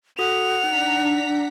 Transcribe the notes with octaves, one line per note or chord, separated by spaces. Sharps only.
F#4 A4 F#5 D#6 F7
D4 D#4 A#5 B6